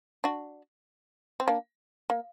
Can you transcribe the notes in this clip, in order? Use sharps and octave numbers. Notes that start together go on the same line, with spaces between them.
D4 F#4
C4
A#3 D4
A#3